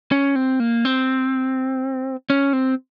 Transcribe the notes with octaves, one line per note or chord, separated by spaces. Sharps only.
C#4
C4
A#3
C4
C#4
C4